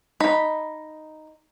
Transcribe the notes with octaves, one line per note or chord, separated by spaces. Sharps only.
D#4 B5